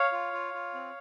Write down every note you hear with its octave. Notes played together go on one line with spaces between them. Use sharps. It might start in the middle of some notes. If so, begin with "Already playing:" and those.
Already playing: C#5 F5
F4
F4
F4
C4